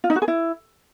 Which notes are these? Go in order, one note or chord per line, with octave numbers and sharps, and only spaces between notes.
F4
D#4
F#4
G#4
E4